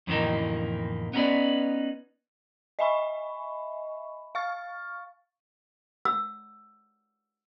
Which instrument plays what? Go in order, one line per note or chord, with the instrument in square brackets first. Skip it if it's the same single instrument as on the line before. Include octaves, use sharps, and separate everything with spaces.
[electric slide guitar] F2 A2 D3 E3 A#3 D#4
B3 C#4 D#4 F4 B4 D5
[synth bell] D#5 E5 G#5 B5 C#6
F5 C#6 F6 A6
[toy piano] E6